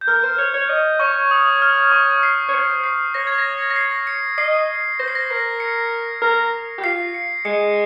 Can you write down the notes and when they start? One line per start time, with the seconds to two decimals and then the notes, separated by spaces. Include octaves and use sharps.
0.01 G6
0.07 A#4 F6
0.23 C5
0.38 C#5
0.54 C#5
0.69 D#5
0.99 C#5 C#6
1.31 D#6
1.62 F6
1.92 C#6
2.23 C7
2.49 C#5
2.54 C5 C#7
2.84 C7
3.14 C#5 A#6
3.27 G#6
3.38 A#6
3.70 A#6
3.76 C7
4.07 C#7
4.38 D#5 C7
4.99 C5 A#6
5.08 C7
5.15 A#6
5.30 A#4 C7
5.60 C#7
6.22 A#4
6.78 G4
6.84 F4 C7
7.14 C#7
7.45 G#3 C#7